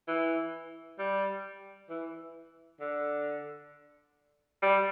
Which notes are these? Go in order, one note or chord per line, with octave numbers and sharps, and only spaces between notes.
E3
G3
E3
D3
G3